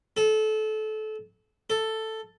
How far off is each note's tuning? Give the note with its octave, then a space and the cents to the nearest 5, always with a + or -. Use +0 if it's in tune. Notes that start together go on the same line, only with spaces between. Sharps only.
A4 -25
A4 +5